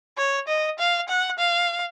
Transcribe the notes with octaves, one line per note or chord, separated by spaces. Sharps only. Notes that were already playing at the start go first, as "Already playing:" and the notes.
C#5
D#5
F5
F#5
F5